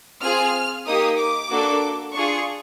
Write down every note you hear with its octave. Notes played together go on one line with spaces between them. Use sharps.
C4 F4 G#4 F6
A#3 D#4 G4 D#6
D6
A#3 D4 F#4 A4
D4 F4 G#4 C#6